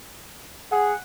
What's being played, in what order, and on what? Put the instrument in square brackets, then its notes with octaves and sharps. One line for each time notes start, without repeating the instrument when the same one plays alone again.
[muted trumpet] G#4 [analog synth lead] F#5